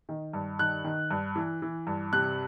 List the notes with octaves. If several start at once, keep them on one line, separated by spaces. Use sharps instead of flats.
D#3
G2
D#3 F#6
D#3
G2
E3
E3
G2
C3 F#6